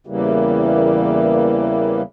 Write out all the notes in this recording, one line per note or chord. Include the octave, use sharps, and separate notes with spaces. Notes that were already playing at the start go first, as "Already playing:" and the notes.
E2 C#3 E3 G3 A#3